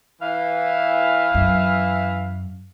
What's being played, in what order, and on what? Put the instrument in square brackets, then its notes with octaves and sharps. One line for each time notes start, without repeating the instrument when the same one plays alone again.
[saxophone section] E3 F5
[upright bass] F#2